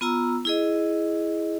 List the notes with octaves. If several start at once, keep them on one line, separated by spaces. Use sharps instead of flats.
B3 F4 A#5 E6
E4 G#4 D#5